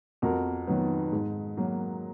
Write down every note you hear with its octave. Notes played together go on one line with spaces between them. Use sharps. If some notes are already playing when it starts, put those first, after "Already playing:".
F2 F#4 A#4
D#3 F#3 B3
G#2
F#3 A#3